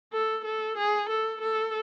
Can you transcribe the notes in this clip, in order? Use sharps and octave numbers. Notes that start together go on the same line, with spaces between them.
A4
A4
G#4
A4
A4